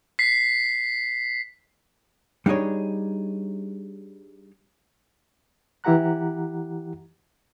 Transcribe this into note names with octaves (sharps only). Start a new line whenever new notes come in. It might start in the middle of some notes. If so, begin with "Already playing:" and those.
B6 C7
G3 D4 D#4 G#4 C#5
E3 E4 G4 F#5 A#5 F#6